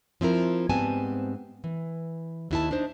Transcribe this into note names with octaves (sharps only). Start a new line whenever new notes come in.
F3 C4 E4 A#4
G#2 G3 B3 C4 G#5 A5
E3
D#2 E4 A5
D4 D#4 C5